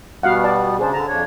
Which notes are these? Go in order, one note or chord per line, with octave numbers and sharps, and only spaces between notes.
B2 G3 B3 F#4 F5 F#5
D5 A5
C#3 D4 G#4 C5 A5
D3 A5 A#5
F2 D4 C#5